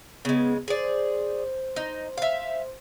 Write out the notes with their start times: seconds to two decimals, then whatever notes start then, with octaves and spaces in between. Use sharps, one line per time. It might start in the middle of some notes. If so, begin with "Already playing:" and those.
0.25 C#3 G#3 B3
0.68 G#4 C5 D5
1.76 D#4
2.18 E5 F5